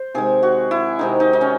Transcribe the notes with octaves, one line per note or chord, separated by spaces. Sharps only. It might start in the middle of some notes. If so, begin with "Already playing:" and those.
Already playing: C5
C3 D#3 G#3 G#4
F#4
E4
C3 D#3 G#3 D#4
D#4
D#4
C#4